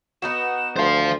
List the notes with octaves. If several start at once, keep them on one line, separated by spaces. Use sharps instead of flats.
B3 D#4 F#4 E7
D2 C5 F5 C6